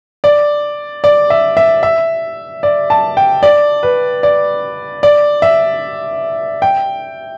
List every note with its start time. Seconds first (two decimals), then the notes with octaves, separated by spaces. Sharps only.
0.24 D5
1.04 D5
1.30 E5
1.57 E5
1.83 E5
2.63 D5
2.90 A5
3.17 G5
3.43 D5
3.83 B4
4.23 D5
5.03 D5
5.42 E5
6.62 G5